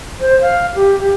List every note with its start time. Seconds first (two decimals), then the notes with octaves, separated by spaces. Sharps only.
0.20 C5
0.41 F5
0.75 G4
0.99 G4